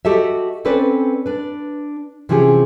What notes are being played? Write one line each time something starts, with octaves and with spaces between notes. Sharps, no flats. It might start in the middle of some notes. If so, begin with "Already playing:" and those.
F#4 G4 A4 D#5 E5
C4 C#4 A4 B4 C5 D5
D4 B4
C3 E3 F3 C#4 G4 G#4